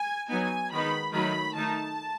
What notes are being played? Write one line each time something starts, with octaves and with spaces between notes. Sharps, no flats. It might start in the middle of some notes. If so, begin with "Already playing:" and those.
Already playing: G#5
F#3 B3 D#4 G#5
D#3 G#3 B3 D#4 B5
D#3 F#3 A3 D#4 B5
D#3 A3 D#4 A5